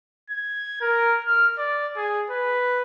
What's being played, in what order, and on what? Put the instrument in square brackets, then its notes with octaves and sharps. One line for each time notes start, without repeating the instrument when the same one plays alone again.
[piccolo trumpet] G#6
A#4
F6
D5
G#4
B4